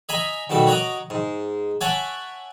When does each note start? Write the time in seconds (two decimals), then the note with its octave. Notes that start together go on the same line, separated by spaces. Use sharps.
0.09 D#5 E5 G#5 A#5 B5 D#6
0.50 D#2 B2 G3 A4
0.67 F#4 C#5 D#5 A#5 D6
1.10 G#2
1.81 C#5 E5 F#5 G#5 A5 D6